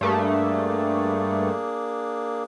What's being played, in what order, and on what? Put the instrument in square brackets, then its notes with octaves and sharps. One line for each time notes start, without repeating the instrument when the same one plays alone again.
[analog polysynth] G2 A3 [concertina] A#3 D4 G#4